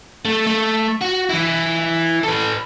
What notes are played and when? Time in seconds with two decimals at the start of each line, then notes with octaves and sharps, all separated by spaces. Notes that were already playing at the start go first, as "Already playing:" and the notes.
0.25 A3
0.47 A3
1.01 F#4
1.30 E3 E4
2.24 A4 B4